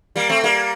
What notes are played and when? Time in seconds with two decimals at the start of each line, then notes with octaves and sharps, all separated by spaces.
0.16 G3 A#3
0.29 A3 C4
0.44 G3 A#3